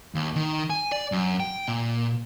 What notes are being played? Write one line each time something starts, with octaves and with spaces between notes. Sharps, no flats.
D#2
D#3
G#5
D5
F#2
G5
A#2